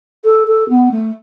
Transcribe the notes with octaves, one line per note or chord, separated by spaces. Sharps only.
A4
A4
B3
A3